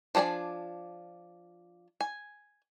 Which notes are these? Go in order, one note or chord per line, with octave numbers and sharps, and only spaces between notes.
F3 D4 G#4 D5 G#5
G#5